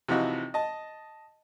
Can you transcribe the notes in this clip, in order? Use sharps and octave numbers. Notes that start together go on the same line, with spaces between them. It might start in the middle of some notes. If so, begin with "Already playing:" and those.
C3 E3 F3 D#4 F#4
D#5 A5